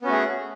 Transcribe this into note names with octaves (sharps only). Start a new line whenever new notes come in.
A3 B3 C#4 F#4 G#4